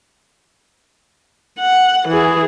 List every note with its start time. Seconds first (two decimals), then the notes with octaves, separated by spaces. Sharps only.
1.59 F#5
2.08 E3 G#4